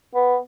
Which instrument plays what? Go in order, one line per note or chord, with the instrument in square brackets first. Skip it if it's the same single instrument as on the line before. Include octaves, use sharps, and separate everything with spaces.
[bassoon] B3